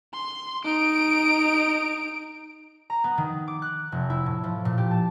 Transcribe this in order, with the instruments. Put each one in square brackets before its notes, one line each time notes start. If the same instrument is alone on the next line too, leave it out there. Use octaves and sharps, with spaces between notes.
[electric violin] C6
D#4 D7
[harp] A#5
B3
D#3
D6
F#6
F1
E4
A2
F3
A#2
G4
A5